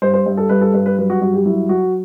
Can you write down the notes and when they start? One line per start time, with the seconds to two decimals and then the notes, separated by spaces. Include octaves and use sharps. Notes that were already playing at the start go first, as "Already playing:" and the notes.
0.02 G2 C5
0.14 C5
0.26 G2
0.37 A4
0.49 G2 B4
0.61 A4
0.74 G2 B4
0.86 B4
0.98 F#3 B4
1.10 F#4
1.21 G2 F#4
1.34 G4
1.45 F#3 E4
1.69 F#3 F#4